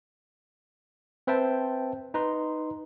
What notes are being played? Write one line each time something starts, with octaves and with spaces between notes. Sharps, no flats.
C4 B4 C5 E5 G5 A5
D#4 B4 A#5 C6